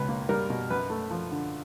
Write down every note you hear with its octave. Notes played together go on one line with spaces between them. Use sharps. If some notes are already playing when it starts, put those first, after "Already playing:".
Already playing: C#2 B2 B4
A#3
G3 A#4
B2
F#2 B4
A3
F3
D3